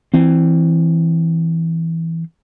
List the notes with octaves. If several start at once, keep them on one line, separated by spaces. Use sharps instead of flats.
E3 C4